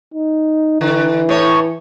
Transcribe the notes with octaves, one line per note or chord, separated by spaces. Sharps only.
D#4
D3 E3
A2 C#5